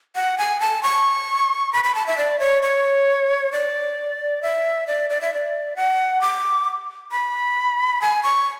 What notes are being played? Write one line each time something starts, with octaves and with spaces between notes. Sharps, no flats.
F#5
G#5
A5
C#6
B5
B5
A5
E5
D5
C#5
C#5
D5
E5
D5
D5
E5
D5
F#5
D6
B5
G#5
C#6